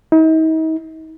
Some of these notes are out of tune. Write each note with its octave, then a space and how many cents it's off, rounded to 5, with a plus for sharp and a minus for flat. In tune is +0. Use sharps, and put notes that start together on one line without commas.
D#4 +40